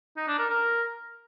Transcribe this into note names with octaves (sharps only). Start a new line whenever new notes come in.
D#4
D4
A#4
A#4